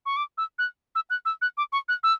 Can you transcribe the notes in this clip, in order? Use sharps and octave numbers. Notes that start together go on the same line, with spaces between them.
C#6
D6
E6
F#6
E6
F#6
E6
F#6
D6
C#6
F#6
E6